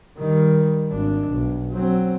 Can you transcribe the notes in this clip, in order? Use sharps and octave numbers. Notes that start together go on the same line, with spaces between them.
D#3 G3
G#1 D4
B1
F#3 C4